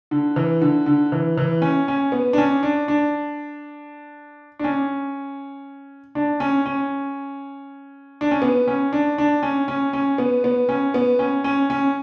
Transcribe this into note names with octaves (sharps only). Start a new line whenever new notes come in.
D3
E3
D3
D3
E3
E3
C#4
C#4
B3
D4
C#4
D4
D4
D4
C#4
D4
C#4
C#4
D4
C#4
B3
C#4
D4
D4
C#4
C#4
C#4
B3
B3
C#4
B3
C#4
C#4
C#4